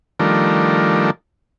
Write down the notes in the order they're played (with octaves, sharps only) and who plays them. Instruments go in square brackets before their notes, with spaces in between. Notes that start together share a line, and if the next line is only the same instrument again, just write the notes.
[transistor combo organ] D#3 F3 G3 A3 D4 A#4